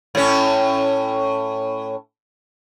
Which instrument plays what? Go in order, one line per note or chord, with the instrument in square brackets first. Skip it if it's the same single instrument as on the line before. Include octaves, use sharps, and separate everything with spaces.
[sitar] A2 C#4